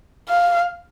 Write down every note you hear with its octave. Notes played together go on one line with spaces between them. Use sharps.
F5